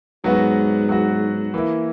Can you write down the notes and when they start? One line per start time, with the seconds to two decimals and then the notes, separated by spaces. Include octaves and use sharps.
0.24 G#2 F#3 B3 F#4
0.89 F#3 B3 F#4
1.54 E3 A#3 E4